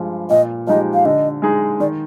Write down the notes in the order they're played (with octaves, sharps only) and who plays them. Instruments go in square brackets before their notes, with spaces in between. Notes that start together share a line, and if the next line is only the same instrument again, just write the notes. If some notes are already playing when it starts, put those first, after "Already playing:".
Already playing: [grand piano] G2 F3 G#3
[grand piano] A#2 [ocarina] D#5
[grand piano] F3 G#3 D#4 G4 [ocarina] D#5
[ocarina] F5
[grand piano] D3 [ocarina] D#5
[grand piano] G#3 D#4 G#4
[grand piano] D#3 [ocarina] D5